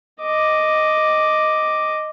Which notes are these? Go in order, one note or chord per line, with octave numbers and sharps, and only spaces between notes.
D#5 D6